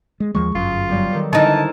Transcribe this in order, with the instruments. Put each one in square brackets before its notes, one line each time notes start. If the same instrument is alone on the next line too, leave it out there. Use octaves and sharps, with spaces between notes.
[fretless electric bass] G#3
[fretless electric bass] D#2 F3 G#3 [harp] C#6
[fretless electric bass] G1 F#2 [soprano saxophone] F4 [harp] G#4
[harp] F#3 G3 B3
D#3 A4
[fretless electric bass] D3 [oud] E3 D#4 [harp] C4 F6 [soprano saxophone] A5